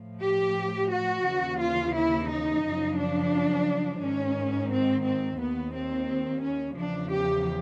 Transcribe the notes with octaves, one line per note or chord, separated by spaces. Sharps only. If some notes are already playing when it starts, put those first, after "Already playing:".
Already playing: A2 F3
G4
F#4
D#2 C#3 E3
F4
E4
D#4
F#2 C#3 F3
D4
G#2 D#3 C#4
C4
C4
D#2 D#3 B3
C4
C#4
E2 C#3 F3 D4
G4